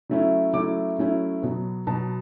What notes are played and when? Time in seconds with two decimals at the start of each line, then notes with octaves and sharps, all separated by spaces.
0.09 F#3 A3 C#4 E4
0.53 F#3 A3 C#4 E4 D6
0.98 F#3 A3 C#4 E4
1.42 B2 F#3 B3
1.87 B2 F#3 B3 A5